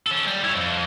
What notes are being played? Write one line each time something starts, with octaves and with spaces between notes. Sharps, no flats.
C#4 A4
G3
E4 C#5
F2